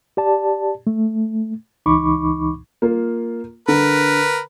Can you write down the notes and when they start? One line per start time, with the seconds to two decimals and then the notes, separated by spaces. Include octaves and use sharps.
0.17 G4 D5 A5
0.87 A3
1.86 C#2 E3 D#4 B5 C#6 D6
2.82 A#3 F4
3.68 D3 A#4 B4